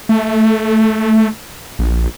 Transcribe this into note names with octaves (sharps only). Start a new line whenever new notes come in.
A3
A#1